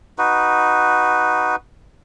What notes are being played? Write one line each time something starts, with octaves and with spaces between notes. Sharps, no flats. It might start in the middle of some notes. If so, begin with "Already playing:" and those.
D#4 F#4 B4